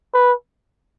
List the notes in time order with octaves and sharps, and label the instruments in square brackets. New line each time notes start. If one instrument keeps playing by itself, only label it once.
[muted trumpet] B4